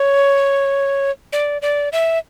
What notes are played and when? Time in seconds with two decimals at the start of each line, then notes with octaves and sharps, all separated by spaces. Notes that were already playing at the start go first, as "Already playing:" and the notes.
Already playing: C#5
1.33 D5
1.62 D5
1.92 E5